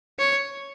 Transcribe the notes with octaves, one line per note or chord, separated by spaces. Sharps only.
C#5